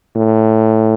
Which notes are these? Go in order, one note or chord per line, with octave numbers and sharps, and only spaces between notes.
A2